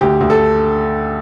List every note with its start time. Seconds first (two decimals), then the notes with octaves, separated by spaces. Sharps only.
0.01 D2 G4
0.21 D2
0.30 A4